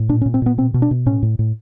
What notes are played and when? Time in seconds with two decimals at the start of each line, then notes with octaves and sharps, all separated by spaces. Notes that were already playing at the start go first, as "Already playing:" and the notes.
Already playing: A2
0.09 A#2 D4
0.21 C#4
0.26 A#2
0.34 C4
0.42 A#2 B3
0.58 B2 C4
0.74 B2
0.82 D4
0.91 B2
1.06 A2 C#4
1.22 A2
1.39 A2